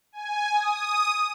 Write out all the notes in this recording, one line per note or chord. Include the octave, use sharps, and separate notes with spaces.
G#5
D#6